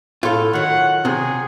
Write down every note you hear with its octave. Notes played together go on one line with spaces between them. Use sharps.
A2 F4 A4
D#3 F#3 F#5
C3 G#4